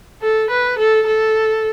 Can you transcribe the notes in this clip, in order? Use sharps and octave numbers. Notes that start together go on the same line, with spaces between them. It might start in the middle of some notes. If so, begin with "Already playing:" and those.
A4
B4
A4
A4